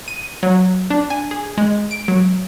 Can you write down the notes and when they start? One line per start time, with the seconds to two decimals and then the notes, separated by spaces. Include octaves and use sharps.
0.08 D#7
0.43 F#3
0.90 D4
1.10 G#5
1.31 G#4
1.58 G#3
1.91 D7
2.08 F#3